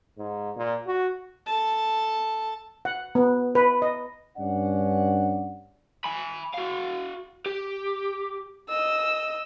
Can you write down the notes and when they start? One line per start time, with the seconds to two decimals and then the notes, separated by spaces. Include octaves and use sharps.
0.18 G#2
0.57 A#2
0.87 F#4
1.46 A4 A5
2.85 F#5
3.15 B3
3.55 B4
3.82 D#5
4.38 G2 C#4 D4 D5 F#5
6.04 G#5 B5
6.54 F#4 F5
7.46 G4
8.70 D#5 E6